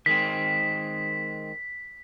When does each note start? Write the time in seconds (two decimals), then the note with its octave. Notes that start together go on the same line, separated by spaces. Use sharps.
0.06 D#3 G#3 C4 B6